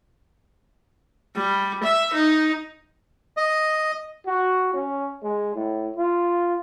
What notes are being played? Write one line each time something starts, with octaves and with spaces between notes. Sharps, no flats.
G3
E5
D#4
D#5
F#4
C#4
G#3
A2
F4